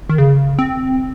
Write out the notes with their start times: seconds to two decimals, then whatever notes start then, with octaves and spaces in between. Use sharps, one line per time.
0.09 D#3
0.18 C#3
0.59 C4